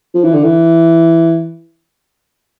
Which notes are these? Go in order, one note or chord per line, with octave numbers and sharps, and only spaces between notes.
F3
E3
D3
E3